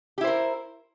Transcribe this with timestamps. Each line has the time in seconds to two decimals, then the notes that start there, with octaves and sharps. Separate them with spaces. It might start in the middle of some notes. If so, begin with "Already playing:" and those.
0.18 G4
0.21 E4
0.24 C5
0.27 A#4